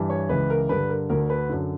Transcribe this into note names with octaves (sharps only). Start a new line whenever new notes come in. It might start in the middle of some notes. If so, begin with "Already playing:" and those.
Already playing: G2 E3
C#5
C#2 C#3 E3 B4
A#4
G2 D3 B4
A#4
D2 D3 A#4
B4
F#2 D3